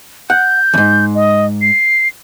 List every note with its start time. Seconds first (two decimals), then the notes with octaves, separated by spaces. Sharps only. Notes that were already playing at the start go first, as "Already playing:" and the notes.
0.30 F#5 G6
0.74 E2 G#2
1.15 D#5
1.62 C7